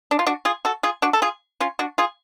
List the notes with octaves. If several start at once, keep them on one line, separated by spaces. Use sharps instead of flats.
D4
F4
D4 F#4
F4 G#4
F#4 A4
F4 G#4
D4 F#4
A4
F4 G#4
C#4 F4
D4 F#4
F4 G#4